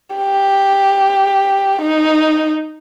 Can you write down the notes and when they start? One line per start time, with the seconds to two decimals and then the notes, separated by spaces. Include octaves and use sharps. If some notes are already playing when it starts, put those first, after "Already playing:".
0.16 G4
1.82 D#4